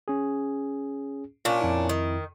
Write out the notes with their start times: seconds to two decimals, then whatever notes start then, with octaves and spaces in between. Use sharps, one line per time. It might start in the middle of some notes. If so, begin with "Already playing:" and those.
0.08 C#4 G#4
1.45 A#2 C#4 D4 F4
1.61 F2 E4
1.89 D#3